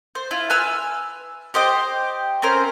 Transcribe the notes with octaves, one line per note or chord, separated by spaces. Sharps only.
C5
E4 F4
B4 G#5 E6 F6
G4 C5 D#5 G5
C4 C#4 A#4 C5